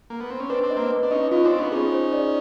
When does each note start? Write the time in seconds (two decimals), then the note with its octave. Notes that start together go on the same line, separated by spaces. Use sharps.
0.10 A#3
0.20 B3
0.30 C4
0.40 C#4
0.49 C4 D4 B4
0.63 C4 D4
0.70 D#5
0.77 A#3 C4
0.91 B4
1.03 D4
1.11 C#4 D#4 D#5
1.32 C#4 D#4 F4
1.45 C4 D4
1.51 F4
1.58 B3 C#4
1.72 C#4 D#4 G#4
1.92 C5
2.13 D5